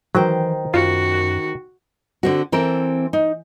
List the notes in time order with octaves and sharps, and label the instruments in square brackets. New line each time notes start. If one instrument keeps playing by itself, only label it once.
[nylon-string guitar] D#3 C5 G5 [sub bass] E3 [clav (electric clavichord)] F#3
[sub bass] F#2 [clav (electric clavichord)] F4 [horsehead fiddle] F#4
[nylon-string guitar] D3 C4 F#4
E3 C4 A4 A#4
D#4